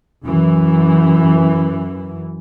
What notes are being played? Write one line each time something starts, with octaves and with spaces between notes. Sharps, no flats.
F#2 E3